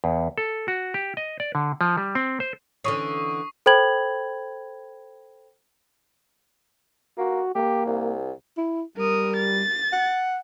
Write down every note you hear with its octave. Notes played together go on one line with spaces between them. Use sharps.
E2
A4
F#4
G4
D#5
D5
D3
F3
G3
C4
C5
D3 E3 C#4 C#6 D#6 C7
A4 C5 G5 B5 G#6 F#7
A#3 F#4
A#3 G4
C2
E4
G3 A#4 D#6
A6
F#5